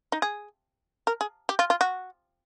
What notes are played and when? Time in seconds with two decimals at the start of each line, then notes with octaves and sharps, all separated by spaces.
0.12 D#4
0.22 G#4
1.07 A#4
1.21 G#4
1.49 G4
1.59 F4
1.70 F4
1.81 F#4